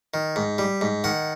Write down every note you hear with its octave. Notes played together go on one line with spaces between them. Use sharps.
D#3
G#2
G3
G#2
D#3 F#5